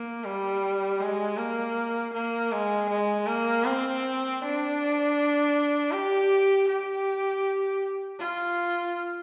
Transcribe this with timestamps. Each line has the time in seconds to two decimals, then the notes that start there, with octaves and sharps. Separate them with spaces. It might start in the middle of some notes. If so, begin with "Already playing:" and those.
Already playing: A#3
0.24 G3
1.00 G#3
1.37 A#3
2.13 A#3
2.52 G#3
2.89 G#3
3.27 A#3
3.65 C4
4.41 D4
5.92 G4
6.68 G4
8.19 F4